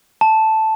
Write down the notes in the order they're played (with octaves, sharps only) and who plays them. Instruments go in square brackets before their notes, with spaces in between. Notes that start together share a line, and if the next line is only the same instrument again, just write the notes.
[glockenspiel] A5